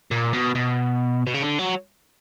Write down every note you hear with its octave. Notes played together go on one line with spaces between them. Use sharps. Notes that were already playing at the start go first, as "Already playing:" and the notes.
A#2
B2
B2
B2
C#3
D3
F#3